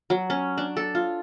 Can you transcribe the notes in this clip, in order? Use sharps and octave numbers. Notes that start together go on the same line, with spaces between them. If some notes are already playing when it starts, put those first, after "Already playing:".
F#3
C#4
D4
A4
F4